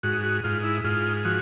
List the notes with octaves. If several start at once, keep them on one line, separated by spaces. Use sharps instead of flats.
G#2 F#4
F#4
G#2 F4
E4
G#2 F4
F3 F#4